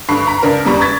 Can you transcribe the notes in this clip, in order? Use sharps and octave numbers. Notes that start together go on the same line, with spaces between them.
D2 G2 D3 B5 C#6 C7
A#5 B6
C#2 D4 A#4
E2 C#3 G3 A#5 B5 C#6
C#6 G#6 A6 B6